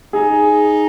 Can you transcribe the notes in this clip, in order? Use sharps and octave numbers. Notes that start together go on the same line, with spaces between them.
D#4 G#4